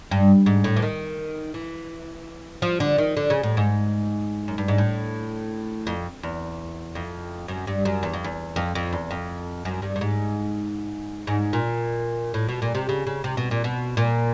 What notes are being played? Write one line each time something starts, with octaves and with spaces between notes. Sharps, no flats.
G2
G#2
A2
E3
D#3
E3
F3
D3
D#3
D3
C#3
A2
G#2
F#2
G2
G#2
A2
F2
E2
F2
F#2
G2
F#2
E2
F2
E2
F2
F2
E2
F2
F#2
G2
G2
G#2
G#2
A#2
A2
B2
A#2
C3
C#3
C#3
C3
B2
A#2
B2
A#2